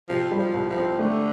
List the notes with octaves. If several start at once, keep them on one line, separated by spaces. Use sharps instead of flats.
C3 F3
G3
F3
C2
F3
C4
D3 A3